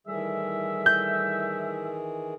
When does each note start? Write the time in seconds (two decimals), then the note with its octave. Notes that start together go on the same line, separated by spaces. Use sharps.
0.07 A2 D#3 E3 G3 G#4 E5
0.86 G6